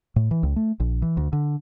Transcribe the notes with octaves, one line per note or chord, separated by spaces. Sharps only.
A2
E3
C#2
A3
A#1
E3
D2
D3